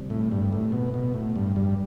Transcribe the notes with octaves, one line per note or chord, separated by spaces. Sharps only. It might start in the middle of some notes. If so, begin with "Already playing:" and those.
Already playing: D2 C3 G3 C4
A2
G2
A2
B2
B2
A2
G2
G2